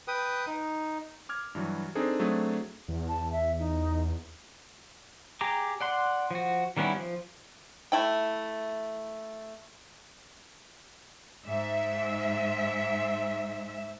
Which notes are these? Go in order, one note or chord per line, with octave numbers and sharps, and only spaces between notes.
B4 G5 D#6
D#4
D6 F6 G#6
G2 E3 F#3
C4 D4 D#4 G#4 A4
F#3 A3 C4 D4 G#4
E2
A5
E5
D#4
G4 G#4 A#5 D6
D5 F#5 C6
F3 F#4
D#3 G3 B3 C#4 E4
F3
A3 E4 G5
G#2 E5